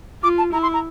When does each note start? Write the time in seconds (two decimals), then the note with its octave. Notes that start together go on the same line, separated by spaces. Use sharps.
0.23 F4 D6
0.38 A5
0.53 E4 A#5
0.62 C6
0.73 A#5